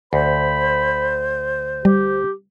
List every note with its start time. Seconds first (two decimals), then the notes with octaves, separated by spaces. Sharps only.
0.13 D2 C5 B5
1.85 G3 G4